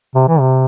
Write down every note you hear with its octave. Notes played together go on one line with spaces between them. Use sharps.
C3
E3
C3